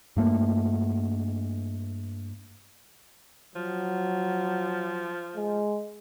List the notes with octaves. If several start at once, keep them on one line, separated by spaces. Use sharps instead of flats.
G2 A3 A#3
F3 F#3
G#3